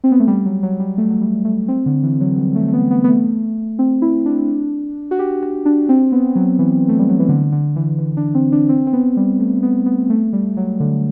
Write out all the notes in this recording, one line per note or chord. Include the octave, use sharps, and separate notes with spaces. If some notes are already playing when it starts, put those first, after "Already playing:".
C4
B3
A3
G3
F#3
F#3
G3
A3
F#3
G3
A3
C4
D3
E3
F#3
G3
A3
A3
B3
B3
B3
A3
C4
E4
D4
F#4
G4
F#4
D4
C4
B3
F#3
E3
A3
G3
F#3
E3
D3
D3
E3
E3
D4
C4
D4
C4
C4
B3
G3
A3
B3
B3
A3
G3
F#3
D3